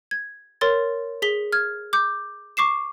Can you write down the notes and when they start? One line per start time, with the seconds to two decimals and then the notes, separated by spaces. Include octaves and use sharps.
0.11 G#6
0.61 A#4 C#5 C6 A6
1.22 G#4 B6 G7
1.52 F6 G#6
1.93 D6 G6
2.57 C#6 D6 C7 E7